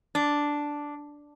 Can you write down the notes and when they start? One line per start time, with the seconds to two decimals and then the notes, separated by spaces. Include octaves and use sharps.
0.15 D4